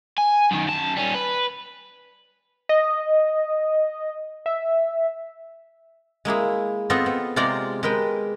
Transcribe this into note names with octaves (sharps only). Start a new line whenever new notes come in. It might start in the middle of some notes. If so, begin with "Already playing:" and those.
G#5
F#2 D#3
F#2 A5
G3 C#4
B4
D#5
E5
G#3 A#3 E4 G#4
B3 C4 F4 A4 D#5
B3
C3 G#3 F4 D5 A#5
G#3 A#4 B4 G5